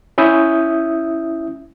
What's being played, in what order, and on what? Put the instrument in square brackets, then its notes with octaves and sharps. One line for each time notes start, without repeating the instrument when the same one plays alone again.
[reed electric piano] C#4 E4 E5 D#6 G6